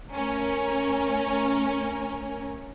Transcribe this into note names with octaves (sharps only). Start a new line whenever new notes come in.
A3 C#4 A#4